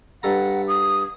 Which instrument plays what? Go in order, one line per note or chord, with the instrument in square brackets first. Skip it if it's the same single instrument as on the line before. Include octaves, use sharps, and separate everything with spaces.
[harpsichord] G2 A4 A#5 [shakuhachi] F#5
[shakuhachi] D#6